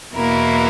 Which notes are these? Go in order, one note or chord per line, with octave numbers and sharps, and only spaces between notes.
E2 B2 A#3 E4 A#4